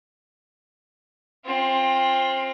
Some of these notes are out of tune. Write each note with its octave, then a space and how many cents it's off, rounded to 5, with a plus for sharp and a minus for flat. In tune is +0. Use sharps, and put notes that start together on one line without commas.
C4 +25 F4 +5